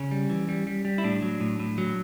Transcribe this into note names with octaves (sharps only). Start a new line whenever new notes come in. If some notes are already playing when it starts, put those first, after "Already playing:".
Already playing: C#3 C#4
G3
E3
G3
G3
G3
E4
A2 D4
F#3
A2
A2
F#3